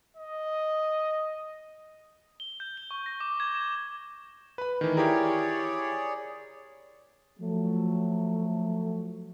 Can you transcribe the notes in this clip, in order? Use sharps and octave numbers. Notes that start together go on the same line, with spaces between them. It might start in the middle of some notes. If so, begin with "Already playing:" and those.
D#5
G7
G6
G7
C#6
A#6
D6
G#6
E7
B4 B5
D#3 E3 A3
E4 G4 G#4 A#4 C#5 D5
F3 F#3 A3